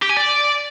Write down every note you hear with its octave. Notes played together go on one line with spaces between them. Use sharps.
G4
G#5
D5